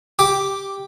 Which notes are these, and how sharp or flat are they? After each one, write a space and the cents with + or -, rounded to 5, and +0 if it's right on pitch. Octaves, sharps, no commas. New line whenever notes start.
G4 +0 D6 +0